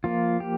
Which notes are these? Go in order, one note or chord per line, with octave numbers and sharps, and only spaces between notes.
F3 A#3 F4
G4